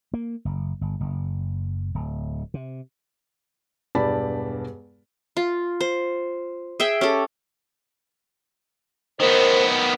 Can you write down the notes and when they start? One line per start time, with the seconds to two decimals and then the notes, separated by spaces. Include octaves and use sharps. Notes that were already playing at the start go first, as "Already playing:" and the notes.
0.13 A#3
0.45 F#1
0.81 G1
1.00 F#1
1.95 D1
2.54 C3
3.95 E1 G2 G4 D5 A5 B5
5.37 F4
5.81 C5
6.80 G#4 E5 G5
7.01 C#4 G4 A4
9.20 D#3 B3 A#4 C5